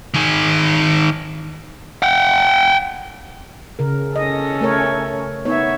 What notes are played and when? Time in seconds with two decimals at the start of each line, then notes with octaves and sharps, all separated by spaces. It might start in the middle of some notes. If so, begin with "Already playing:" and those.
0.14 D#3 G#4
2.03 F#5 G5
3.79 C#3 A#4
4.16 C#4 A4 D#5
4.61 A3 A#4 C#5
5.45 B3 D#4 C#5 E5